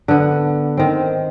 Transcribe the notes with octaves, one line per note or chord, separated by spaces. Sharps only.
D3 B3
D#3 C4